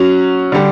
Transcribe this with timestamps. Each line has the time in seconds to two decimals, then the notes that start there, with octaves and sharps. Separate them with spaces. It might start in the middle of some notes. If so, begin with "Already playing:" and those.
Already playing: F#3 C#4 F#4
0.52 D3 G3 D4